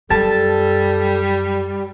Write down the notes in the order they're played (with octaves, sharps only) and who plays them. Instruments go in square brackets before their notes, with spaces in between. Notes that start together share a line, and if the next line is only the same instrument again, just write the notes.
[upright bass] F#2 [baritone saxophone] G3 [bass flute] A4 [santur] A5